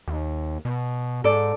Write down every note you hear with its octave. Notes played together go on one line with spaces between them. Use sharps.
D#2
B2
G#2 A4 D5